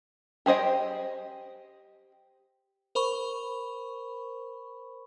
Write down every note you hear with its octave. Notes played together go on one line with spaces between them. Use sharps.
G4 G#4 C5 D#5 G5
A#4 C5 B5 C#6